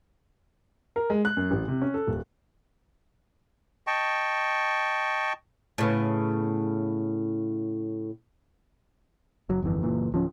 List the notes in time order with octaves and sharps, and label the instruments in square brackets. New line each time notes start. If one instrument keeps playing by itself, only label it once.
[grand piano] A#4
G#3
F#6
F#2
A1
C3
C#4
A4
D#1
[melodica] D#5 G5 A5 C#6
[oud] A2 C#3 B3
[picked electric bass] F#1 F#3
G1 F2 D#3 E3
F#1 A#2 E3
D1 F3 C#4